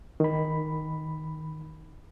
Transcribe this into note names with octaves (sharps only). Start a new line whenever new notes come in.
D#3 B5